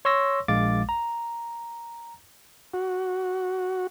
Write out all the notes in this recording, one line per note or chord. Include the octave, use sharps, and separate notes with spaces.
C#5 C6 C#6 E6 A#6
A#1 G#3 F5 D6 A6
A#5
F#4